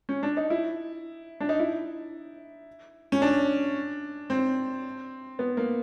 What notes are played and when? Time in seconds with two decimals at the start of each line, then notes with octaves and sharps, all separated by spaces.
0.09 C#4
0.23 D4
0.37 D#4
0.50 E4
1.40 D4
1.49 D#4
1.59 E4
3.12 C#4
3.22 D4
4.30 C4
5.39 B3
5.57 A#3